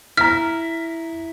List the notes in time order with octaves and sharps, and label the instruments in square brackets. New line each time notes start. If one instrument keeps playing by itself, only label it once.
[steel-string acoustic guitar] E4 [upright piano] A#5 B6 [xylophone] F6